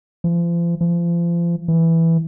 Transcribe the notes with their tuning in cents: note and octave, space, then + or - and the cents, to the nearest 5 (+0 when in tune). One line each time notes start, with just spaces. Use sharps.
F3 -40
F3 -35
E3 +0